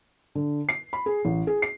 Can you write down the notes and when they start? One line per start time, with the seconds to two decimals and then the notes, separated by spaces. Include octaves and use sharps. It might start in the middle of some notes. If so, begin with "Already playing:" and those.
0.35 D3
0.69 C7
0.93 B5
1.06 G#4
1.25 A1
1.47 G#4
1.62 C7